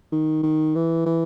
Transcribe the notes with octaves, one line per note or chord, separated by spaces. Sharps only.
D#3
D#3
E3
E3